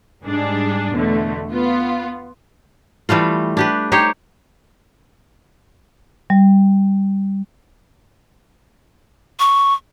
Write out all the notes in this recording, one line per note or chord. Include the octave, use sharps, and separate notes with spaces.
G#2 G3 D4 G#4
E2 B2 D3 A3
B3 F4
E3 G3 A3 F4
D4 G4 B4
D#4 G4 C5 C#5
G3
C#6